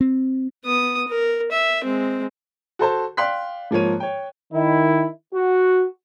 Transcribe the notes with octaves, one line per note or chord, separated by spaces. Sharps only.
C4
B3 D#6
A#4
E5
G#3 C4
F#4 A4 C5 A5
D5 F5 G5 C6 F#6 B6
G#2 F3 A#3 C#5 D#7
C#5 G5
D#3 E4
F#4